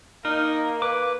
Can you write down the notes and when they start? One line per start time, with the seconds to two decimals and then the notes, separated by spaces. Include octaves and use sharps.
0.25 A#3 D#4 A#4
0.82 B4 D6